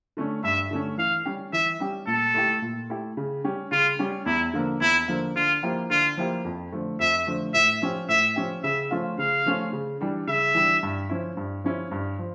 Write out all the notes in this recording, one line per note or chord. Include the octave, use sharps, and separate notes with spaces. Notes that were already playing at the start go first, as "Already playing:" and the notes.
D3 A3 C#4
G2 E5
D3 A3 C#4
E3 F5
G3 C#4 G4
E3 E5
G3 C#4 G4
A#2 A4
A3 E4 G4
A#2
A3 E4 G4
C#3
G3 C#4 G4
C#3 F4
G3 C#4 G4
E2 E4
D3 F3 A#3
E2 E4
D3 F3 A#3
D3 F4
F3 A#3 E4 G4
D3 F4
F3 A#3 E4 G4
F2
D3 F3 A3
F2 E5
D3 F3 A3
A2 E5
F3 C#4 G4
A2 E5
F3 C#4 G4
C#3 E5
F3 A3 C#4 F4
C#3 F5
F3 A3 C#4 F4
C#3
E3 G3 D4
C#3 E5
E3 G3 D4
G2
F3 C#4 E4
G2
F3 C#4 E4
G2
F3